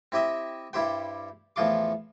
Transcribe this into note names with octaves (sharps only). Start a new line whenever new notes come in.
C4 E4 G4 D#5 E5
G2 G3 E4 G4 C5 G5
E2 A2 F3 F4 C6 D6